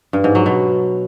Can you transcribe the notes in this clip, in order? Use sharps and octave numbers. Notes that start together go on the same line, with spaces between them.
G2
G#2
F#3
B2